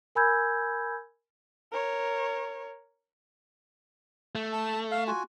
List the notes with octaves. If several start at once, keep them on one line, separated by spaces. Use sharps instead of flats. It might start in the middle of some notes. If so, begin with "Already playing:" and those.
A#4 G#5 B5 E6 G6 G#6
A#4 C#5
A3
A5
F5
F4 F#4 G#5